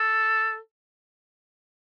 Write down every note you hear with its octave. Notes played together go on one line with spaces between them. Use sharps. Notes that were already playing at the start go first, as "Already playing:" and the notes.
Already playing: A4